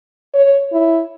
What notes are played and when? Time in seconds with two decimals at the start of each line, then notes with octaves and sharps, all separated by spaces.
0.34 C#5
0.72 E4